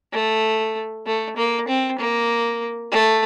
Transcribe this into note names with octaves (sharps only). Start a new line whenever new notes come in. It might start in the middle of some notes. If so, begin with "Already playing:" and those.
A3
A3
A#3
C4
A#3
A3